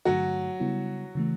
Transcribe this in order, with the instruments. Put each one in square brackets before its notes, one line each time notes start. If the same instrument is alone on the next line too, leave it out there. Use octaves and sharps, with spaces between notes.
[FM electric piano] G2 D3 A3 [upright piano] F#3 F#4
[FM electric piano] C#3 G3 B3 E4
C#3 E3 A3